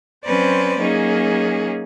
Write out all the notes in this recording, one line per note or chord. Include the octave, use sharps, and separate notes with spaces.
F#3 C4 C#4 B4 C5 D5
F#3 A#3 C#4 D#4 G#4